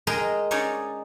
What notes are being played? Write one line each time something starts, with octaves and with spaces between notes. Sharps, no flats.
G#3 G#4 A#4 D#5 G5 A#5
C#4 D#4 C#5 D5